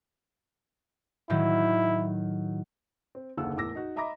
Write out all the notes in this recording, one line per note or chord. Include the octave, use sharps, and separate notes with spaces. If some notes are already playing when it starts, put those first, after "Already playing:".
A2 D#3 F#3 E4
C4
F#1 D#2 D3 F#5 E6
E2 A2 A#4 D6 E6 A#6
D#4 F#4
D#5 E5 A#5 B5 D6 A#6